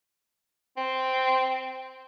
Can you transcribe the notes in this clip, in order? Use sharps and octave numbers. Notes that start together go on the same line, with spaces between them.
C4